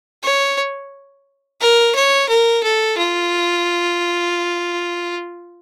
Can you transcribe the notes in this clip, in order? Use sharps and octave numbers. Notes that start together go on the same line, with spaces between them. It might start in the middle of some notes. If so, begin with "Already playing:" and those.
C#5
A#4
C#5
A#4
A4
F4